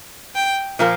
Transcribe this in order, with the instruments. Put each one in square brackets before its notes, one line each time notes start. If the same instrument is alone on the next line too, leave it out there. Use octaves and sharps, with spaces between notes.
[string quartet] G5
[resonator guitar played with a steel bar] A#2 F3 A#3